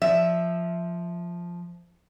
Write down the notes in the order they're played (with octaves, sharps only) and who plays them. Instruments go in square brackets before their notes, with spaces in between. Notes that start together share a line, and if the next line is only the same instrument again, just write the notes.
[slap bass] F3 [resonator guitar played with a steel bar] E5